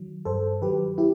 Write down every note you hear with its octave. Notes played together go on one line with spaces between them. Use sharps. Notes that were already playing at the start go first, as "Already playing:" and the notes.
Already playing: D#3 F#3
G2 A4 C5
D#3 F#3 G4 B4
E4 G4